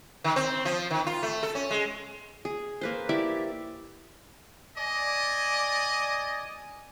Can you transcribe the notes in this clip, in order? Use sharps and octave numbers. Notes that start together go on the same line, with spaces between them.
D#3
C4
F3
D#3
F4
A3
A4
C#4
G#3
G#4
A#3 B4 C5
E4 G4 D5 E5
D5 D#5 G#5